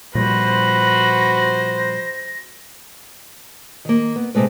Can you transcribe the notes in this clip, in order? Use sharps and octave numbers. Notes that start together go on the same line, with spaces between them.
A#2 F3 G3 F#4 B4 C5 A#6
D#3 A#3
B3
C3 E3 G#3 A3 B4